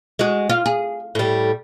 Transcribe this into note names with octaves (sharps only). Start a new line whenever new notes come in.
G#3 F#4
F4
G#4
A2 G3